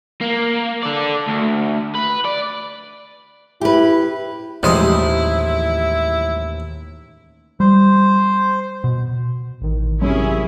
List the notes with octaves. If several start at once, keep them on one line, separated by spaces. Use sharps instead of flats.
A#3
A4 D5
D2
B4
D5
E4 G4 B4
A1 D#2 F3 G3 G#3 E4 C5 D#5
G3 C5
B2
A1 D#3
F#2 C3 C#4 E4 G#4